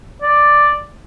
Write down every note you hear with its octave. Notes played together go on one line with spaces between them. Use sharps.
D5